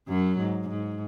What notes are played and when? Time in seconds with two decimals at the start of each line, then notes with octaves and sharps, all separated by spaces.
0.09 F#2 F#3
0.39 G#2
0.69 G#2